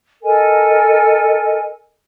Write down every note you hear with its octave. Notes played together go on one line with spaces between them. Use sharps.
A4 A#4 D#5 G#5